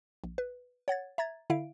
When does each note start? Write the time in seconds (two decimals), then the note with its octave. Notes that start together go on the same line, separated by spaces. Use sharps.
0.24 A#1
0.38 B4
0.88 C#5 F#5 G#6 A6
1.18 E5 A#5 G#6 A6
1.50 D3 E4 E5 F5 D7